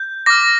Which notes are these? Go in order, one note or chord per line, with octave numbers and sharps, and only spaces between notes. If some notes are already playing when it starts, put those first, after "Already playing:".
Already playing: G6
D6 F6 A#6